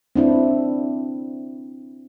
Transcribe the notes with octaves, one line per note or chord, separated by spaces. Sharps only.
C4 D4 E4